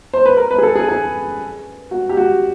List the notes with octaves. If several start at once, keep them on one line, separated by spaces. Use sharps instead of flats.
C5
B4
A#4
B4
G#4
A4
G#4
G#4
F#4
G4
F#4